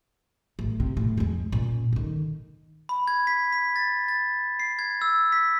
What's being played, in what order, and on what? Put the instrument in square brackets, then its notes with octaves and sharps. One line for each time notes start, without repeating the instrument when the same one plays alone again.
[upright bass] A1
C3
A2
F2 G#3
A#2 C#4
D3 D#3
[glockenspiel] B5
G#6
B6
B6
A6
A6
C7
G#6
E6
B6